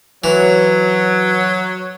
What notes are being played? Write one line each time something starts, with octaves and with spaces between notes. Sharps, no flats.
E3 F#3